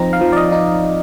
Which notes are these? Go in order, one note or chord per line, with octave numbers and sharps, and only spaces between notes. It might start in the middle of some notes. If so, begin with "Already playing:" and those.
Already playing: F3 C4 D#4 A#5
F5
F3
D5
D#5
D#4